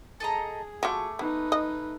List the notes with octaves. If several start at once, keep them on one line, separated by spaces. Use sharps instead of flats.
G#4 A4 D#5 A#5
F#3 A3 F4 C#6 D6
B3 D#4 B4
D#5